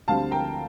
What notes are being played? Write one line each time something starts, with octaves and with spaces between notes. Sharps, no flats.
D2 D3 G3 C4 F5 A5
G5 A#5